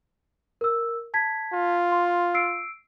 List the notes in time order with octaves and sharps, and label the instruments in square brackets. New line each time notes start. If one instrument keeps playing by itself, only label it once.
[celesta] A#4 E6
A5 G#6 B6
[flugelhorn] F4
[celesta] C6
E6 C7 D7